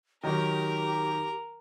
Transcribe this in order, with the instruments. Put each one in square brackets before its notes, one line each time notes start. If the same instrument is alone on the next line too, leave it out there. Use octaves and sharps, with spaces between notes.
[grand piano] D#3 F#3 D#4 [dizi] G4 [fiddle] A#4 A#5